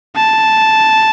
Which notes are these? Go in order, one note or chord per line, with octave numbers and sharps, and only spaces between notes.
A5